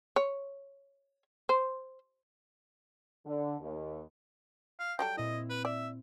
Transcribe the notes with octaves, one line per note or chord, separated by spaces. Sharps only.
C#5
C5
D3
D#2
F5
F#3 G3 A4 G5
A#2 C4 E4 D#5
B4
D5 E5